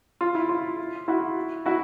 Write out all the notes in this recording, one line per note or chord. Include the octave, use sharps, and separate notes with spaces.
F4
E4
F4
E4 F#4
E4 F#4